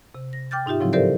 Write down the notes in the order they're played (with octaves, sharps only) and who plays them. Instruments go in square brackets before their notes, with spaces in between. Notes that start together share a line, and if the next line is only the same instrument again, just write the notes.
[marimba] C3
A#6
G5 D6 F6 G6 A6
G#2 D#4 F4 G4 E5
A2 C#3 F3 F#3 C4 E4
G4 A4 A#4 C5 D5 E5